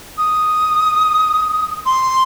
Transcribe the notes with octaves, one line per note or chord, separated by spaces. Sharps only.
D#6
C6